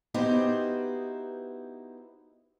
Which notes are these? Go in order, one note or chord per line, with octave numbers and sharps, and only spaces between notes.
B3 D#4 E4 F#4 G4 C5